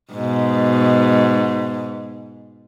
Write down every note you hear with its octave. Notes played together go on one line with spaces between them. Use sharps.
G#2 B2